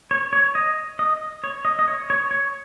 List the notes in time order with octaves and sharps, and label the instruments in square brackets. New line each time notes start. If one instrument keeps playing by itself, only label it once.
[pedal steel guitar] C#5
C#5
D#5
D#5
C#5
D#5
D#5
C#5
C#5
C#5